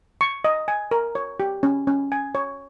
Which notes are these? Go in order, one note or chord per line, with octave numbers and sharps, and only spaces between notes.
C#6
D#5
G#5
A#4
C#5
G4
C#4
C#4
G#5
C#5